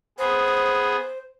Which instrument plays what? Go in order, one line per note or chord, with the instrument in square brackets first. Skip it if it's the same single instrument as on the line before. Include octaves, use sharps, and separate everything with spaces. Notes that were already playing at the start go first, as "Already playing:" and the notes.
[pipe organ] B3 G#4 [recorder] C5